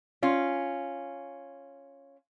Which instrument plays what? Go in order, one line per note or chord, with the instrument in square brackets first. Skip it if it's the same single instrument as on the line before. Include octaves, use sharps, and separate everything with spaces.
[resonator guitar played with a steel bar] C#4 F4